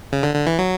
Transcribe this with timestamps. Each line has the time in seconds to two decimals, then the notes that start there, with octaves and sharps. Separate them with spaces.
0.12 C#3
0.23 D3
0.35 D3
0.47 E3
0.59 F#3